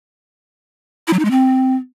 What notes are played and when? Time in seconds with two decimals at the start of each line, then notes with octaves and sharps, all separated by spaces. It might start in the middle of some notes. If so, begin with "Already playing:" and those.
1.07 E4
1.13 F#3
1.19 D#4
1.25 G#3
1.31 C4